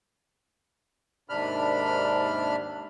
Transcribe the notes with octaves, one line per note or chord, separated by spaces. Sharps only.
D#2 G#2 C3 D4 B5 F6